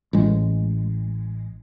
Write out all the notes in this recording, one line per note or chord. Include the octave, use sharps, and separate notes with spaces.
A1 G#3